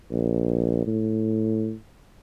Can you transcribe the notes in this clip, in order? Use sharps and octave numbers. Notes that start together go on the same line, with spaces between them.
A#1
A2